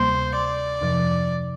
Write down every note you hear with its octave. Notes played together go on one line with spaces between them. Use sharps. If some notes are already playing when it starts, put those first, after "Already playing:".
Already playing: D2 C3 G3 A#3 C5
D5
F2 C3 F3